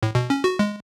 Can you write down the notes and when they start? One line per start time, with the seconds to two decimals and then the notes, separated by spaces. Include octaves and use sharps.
0.03 A2
0.15 B2
0.30 C#4
0.44 F#4
0.59 G#3